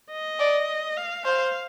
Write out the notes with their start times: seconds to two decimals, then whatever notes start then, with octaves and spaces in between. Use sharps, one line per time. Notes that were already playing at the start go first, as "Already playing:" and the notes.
0.11 D#5
0.39 D5
0.97 F5
1.25 C5 F5